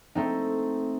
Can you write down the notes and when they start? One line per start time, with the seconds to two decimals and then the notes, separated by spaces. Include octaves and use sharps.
0.15 A3 C4 D#4